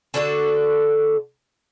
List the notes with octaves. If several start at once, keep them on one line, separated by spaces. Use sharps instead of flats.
D3 D4 F#4 A4